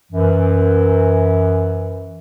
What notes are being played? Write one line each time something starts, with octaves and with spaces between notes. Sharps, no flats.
F#2 E3